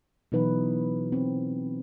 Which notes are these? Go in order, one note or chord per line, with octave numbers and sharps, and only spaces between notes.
B2 E3 F#3 D#4 B4
C4